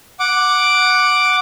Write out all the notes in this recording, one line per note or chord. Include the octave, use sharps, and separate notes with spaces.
F#5 D6